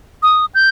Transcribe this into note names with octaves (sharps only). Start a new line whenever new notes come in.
D#6
G6